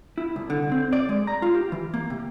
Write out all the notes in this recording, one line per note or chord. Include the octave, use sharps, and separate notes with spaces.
E4
C2
D3
C4
D5
G#3
A#5
F4
G4
E3
A#3
C3